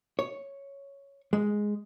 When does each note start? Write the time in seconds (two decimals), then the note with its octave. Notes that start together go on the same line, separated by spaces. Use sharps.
0.19 C#5
1.33 G#3